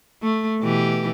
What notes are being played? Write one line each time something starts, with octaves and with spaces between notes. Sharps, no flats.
A3
B2 E3 G4